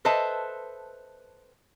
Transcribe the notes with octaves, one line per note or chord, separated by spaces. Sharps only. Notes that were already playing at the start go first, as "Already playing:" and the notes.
A4 B4 C5 D#5 E5 A5